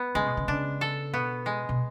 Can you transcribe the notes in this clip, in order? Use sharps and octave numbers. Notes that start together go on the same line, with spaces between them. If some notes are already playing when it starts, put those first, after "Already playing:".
Already playing: B3
C#3 G#3
B2
C#3
C#3 D4
A4
B2 B3
G#3
B2